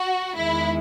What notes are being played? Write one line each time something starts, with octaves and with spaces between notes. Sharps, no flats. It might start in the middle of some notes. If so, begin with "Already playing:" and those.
Already playing: F#4
E2 D#3 G#3 E4